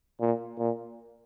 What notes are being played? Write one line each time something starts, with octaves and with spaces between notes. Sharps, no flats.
A#2
A#2